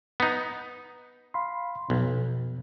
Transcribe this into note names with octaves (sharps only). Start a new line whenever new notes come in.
B3 D#4
F5 B5 C6
B1 F2 B2 B3